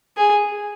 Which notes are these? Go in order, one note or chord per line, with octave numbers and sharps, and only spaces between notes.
G#4